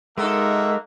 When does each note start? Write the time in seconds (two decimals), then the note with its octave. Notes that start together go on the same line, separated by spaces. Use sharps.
0.18 G#3 A#3 D#4 F#4 A4 A#4 E5